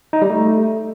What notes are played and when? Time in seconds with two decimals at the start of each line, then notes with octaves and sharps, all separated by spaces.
0.13 D#4
0.22 G3
0.30 A3